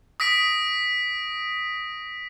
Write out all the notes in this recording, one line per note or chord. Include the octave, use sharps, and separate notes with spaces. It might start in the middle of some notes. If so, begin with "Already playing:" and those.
D#6 A#6 B6 D7